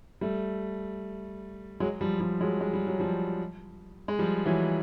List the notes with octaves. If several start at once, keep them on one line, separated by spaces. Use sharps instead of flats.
G3 A3
F#3 G#3
F3 G3
F3 G3
F#3 G#3
G#3
G3
F#3
F3 G3
G#3
F3 G3
E3 F#3